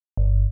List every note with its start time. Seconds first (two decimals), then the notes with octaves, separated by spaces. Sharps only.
0.17 G1